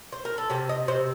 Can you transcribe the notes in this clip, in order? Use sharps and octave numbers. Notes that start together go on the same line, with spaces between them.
C5
A#4
A4
C3 G4
D#5
C3 C5